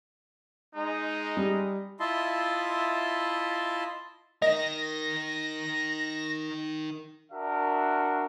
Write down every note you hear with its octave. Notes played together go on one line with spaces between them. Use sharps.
G#3 D#4
G3
E4 F4 D#5 E5 A5 C6
D#4 A#4 D#5 A#6
D4 F#4 A#4 E5